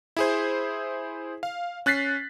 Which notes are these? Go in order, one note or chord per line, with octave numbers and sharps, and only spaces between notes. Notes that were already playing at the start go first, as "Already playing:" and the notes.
E4 G#4 C5
F5
C#4 F#6 A6 B6 C7